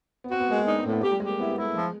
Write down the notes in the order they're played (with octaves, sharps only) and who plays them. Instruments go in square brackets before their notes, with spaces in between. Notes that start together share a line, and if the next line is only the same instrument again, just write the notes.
[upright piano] B3
[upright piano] C4 [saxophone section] F#4
[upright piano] B3
[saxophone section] G#3 [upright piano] A#3
[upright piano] C4
[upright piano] D4 [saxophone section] D#4
[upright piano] C4
[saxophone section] A2
[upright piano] B3
[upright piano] A3 [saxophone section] G4
[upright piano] G3
[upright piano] G#3 [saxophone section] G4
[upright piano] A#3
[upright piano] B3 [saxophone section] E4
[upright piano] B3
[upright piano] G#3 [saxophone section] E4
[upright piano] A3
[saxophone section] F3 [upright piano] G#3